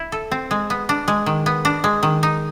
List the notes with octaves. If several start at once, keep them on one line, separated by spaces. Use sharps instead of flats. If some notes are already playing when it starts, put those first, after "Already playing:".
Already playing: E4
A4
C4
G#3
B3
D4
G#3
D#3
B3
D4
G#3
D#3
D#4